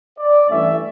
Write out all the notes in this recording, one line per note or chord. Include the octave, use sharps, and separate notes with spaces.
D5
G2 E3 A3 C#4 E5